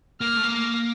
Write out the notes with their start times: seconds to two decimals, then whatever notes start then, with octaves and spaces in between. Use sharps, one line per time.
0.21 A#3 F6
0.37 A3
0.43 A#3